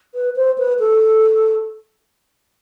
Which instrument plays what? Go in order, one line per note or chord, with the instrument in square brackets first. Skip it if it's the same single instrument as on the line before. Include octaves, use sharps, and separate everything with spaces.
[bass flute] B4
C5
B4
A4